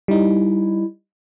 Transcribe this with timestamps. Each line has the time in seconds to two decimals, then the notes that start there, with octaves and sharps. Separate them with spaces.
0.08 G3 D#4 E4